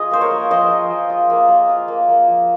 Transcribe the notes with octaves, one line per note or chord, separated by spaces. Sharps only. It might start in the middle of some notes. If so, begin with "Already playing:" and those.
Already playing: F3 F4 G#4 D#5
A#3 C5
A#4 C#5
A#3
F3 C5 D#5
F4
F3
F4
A#3
A#3
F4
A#3
A#3
F3